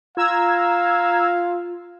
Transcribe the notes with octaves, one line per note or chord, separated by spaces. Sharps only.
F4 F5 A#5 E6 G#6